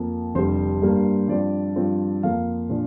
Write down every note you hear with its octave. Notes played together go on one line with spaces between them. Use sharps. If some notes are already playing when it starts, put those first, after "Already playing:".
Already playing: F2 F3 A#3
F1 F2 D3 G3 C5
G2 G3 A#3
G2 F3 C4 D5
G2 F3 C4 F4
F2 F3 A#3 F5
A#2 F3 D4 F4